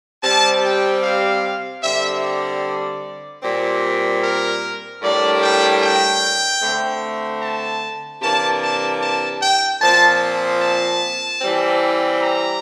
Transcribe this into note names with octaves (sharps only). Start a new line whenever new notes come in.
C3 G3 C4 A5
G5
F5
D3 G3 C4 E5
D5
A#2 G3 C4
A#4
A2 G3 A#3 D4 D5
G5
G5
D3 A3 C4
A5
C3 E3 A#3 D4 A5
A5
A5
G5
A#2 F3 C4 A5
A5
E3 G3 C4
A#5